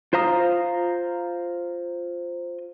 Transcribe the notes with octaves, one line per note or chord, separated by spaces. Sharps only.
F4 C5 F5 A#5 D#6